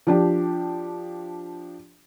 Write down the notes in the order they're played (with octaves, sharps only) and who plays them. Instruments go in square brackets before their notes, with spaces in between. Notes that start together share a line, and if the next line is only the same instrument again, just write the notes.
[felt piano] F3 D4 G4